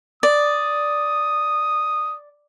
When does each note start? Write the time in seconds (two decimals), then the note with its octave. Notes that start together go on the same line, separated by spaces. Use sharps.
0.23 D5 D#6